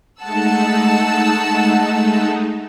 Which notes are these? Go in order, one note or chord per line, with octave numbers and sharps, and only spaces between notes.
G#3 A3 D#4 F#5 A5 E6